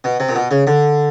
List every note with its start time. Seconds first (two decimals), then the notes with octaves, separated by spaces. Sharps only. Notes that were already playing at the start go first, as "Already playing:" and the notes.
0.04 B2
0.20 C3
0.29 A#2
0.35 B2
0.51 C#3
0.67 D3